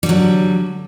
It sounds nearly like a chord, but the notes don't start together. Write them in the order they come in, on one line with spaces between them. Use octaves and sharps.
G3 D3 F#3